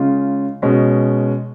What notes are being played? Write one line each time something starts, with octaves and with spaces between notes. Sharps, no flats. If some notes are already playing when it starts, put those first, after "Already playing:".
Already playing: C#3 G#3 C#4 F4
B2 G#3 C#4